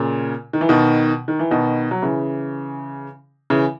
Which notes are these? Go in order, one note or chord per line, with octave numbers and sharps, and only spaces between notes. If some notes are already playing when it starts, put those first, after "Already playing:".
Already playing: A#2 C#3
D#3
E3
B2 D#3
D#3
E3
B2 D#3
F#3
C#3 E3
C#3 E3